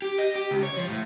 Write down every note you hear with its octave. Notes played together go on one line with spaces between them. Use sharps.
G4
D#5
G4
C#2
C#5
F3
A2